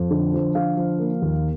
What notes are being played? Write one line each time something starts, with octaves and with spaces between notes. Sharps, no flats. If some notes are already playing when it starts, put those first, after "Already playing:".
Already playing: F2
D3
F3
D3 F5
F3
A#3
D#2